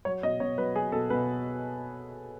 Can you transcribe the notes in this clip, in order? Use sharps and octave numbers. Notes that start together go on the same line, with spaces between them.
F#3 C#5
B2 D#5
B2 C#5
F#3 B4
F#3 G#4
B2 A4
B2 B4